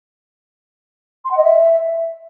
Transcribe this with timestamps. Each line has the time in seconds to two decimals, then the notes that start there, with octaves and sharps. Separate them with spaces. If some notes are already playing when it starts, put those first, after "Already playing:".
1.24 C6
1.31 F#5
1.37 D#5
1.43 E5